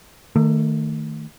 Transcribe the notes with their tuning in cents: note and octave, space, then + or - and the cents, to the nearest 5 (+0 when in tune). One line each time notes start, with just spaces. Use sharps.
D#3 +0 A3 +20